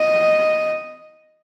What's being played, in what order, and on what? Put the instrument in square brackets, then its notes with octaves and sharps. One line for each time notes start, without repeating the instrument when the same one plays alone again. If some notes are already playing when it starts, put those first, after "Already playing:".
Already playing: [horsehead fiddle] D#5